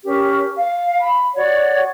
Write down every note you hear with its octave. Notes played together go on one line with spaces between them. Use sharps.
C#4 G4 A#4
F5
B5
F#4 C#5 D5 F#5